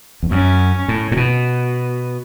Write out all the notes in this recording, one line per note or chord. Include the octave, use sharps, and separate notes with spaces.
E2
F#2 C#4
A2
A2
B2